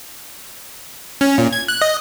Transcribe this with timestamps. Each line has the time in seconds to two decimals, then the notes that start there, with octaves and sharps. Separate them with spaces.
1.21 C#4
1.38 A#2
1.53 G#6
1.68 F#6
1.82 D#5